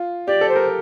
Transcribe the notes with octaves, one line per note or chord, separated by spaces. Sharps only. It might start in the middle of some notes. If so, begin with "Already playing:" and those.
Already playing: F4
G4 D5
A4
C5
A#4